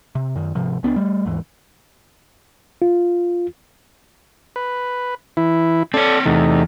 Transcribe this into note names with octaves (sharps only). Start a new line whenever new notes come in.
C3
F#2 D#3
G#2 C3 F3
C#2 B3 C#4 D4
G3 A3
D#2 G#2 E3
F4
B4
E3 E4
C4 A4 C#5 D5
E2 C3 A3 D#4